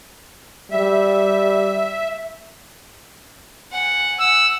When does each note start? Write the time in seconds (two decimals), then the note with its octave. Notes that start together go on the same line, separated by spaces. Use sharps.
0.71 G3 E5
3.72 F#5 G#5
4.20 F#5 E6